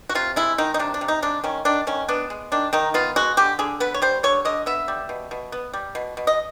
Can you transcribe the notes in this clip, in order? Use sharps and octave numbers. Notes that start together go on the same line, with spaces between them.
F#4
C3 F4
G#3 E4
D#3 D#4
D#4
C3 D4
D4
C3
D#4
G#3 D4
D#3 C#4
D#3 D4
D#3 C#4
B3 D4
G#3
D#3 D4
D#3 D#4
B3 F4
G#3 F#4
D3 G4
D3 G#4
B3 B4
C#5
G3 C5
D3 C#5
D3 D#5
B3 E5
G3
B2
B2
B3
G3
B2
B2
D#5